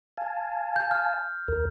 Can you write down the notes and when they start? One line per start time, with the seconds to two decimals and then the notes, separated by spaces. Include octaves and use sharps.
0.18 F5 G#5 A5
0.76 G6
0.91 F6
1.48 D#2 A#4